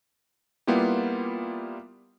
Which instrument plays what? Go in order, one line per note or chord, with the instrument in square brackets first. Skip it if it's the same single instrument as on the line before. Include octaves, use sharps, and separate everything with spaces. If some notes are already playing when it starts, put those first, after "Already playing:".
[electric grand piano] G3 A#3 B3 E4 F4 G4